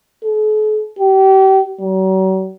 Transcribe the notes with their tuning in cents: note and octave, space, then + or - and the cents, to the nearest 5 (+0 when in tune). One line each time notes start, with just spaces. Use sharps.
A4 -45
G4 -35
F#3 +40